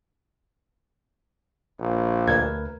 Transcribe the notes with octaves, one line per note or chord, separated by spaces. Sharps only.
A#1
D2 A#4 B4 G#6